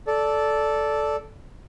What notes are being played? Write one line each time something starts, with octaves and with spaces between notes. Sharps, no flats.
A4 D5